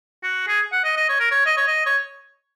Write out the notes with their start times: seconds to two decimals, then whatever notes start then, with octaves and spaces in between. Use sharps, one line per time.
0.23 F#4
0.47 G#4
0.72 F#5
0.84 D#5
0.97 D#5
1.09 C#5
1.20 A#4
1.31 C#5
1.46 D#5
1.57 C#5
1.67 D#5
1.86 C#5